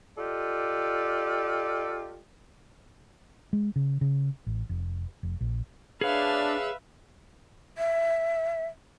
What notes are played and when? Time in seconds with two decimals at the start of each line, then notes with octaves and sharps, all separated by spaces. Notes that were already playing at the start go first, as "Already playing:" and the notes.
0.16 F4 G4 A4 D5 D#5
3.53 G#3
3.76 C#3
4.01 C#3
4.47 A1
4.69 F1
5.23 F1
5.41 A#1
6.01 D4 G#4 B4 C#5 E5 F5
7.78 E5